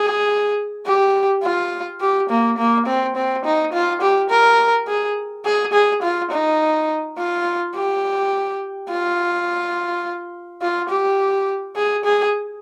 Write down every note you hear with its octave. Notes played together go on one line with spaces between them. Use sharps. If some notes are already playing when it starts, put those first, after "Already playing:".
Already playing: G#4
G4
F4
G4
A#3
A#3
C4
C4
D#4
F4
G4
A#4
G#4
G#4
G#4
F4
D#4
F4
G4
F4
F4
G4
G#4
G#4